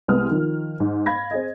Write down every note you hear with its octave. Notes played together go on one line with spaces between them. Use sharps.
C2 G#3 B3 B4 D#6 F6
D#3 F3
G#2
F5 B5 G#6 A#6
C4 G#4 D#5